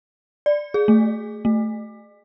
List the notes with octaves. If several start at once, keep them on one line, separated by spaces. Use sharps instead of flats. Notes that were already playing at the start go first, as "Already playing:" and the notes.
D5
G#4
A3
A3